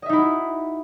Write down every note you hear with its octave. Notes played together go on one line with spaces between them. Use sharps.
D#4 E4 F#4 D#5 E5